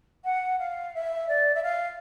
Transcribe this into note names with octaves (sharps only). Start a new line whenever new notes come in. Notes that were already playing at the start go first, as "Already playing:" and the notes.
F#5
F5
E5
D5
E5
F5